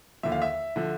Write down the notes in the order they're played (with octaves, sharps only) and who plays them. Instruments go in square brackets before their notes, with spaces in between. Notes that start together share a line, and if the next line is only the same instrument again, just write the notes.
[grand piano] D#2 D3 F3 E5
F5
E5
D3 F3